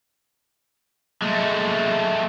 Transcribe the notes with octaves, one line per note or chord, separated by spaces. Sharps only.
G#3 A3